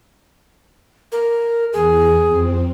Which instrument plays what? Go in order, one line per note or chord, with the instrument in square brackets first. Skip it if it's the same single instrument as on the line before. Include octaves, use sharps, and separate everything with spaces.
[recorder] A#4
[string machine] E2 [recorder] G#4
[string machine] F2 C4